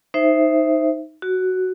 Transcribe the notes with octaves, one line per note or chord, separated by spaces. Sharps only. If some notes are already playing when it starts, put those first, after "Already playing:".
D#4 C5 E5
F#4